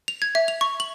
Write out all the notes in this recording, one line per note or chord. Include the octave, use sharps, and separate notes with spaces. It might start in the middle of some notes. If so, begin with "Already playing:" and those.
F7
G#6
E5
F7
C#6
F#7